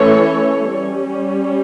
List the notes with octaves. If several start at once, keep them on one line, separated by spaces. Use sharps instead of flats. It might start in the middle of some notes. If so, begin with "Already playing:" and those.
Already playing: E3 A3 C#4 A4 C#5
G3 C#4